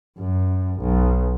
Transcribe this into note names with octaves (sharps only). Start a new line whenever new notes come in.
F#2
B1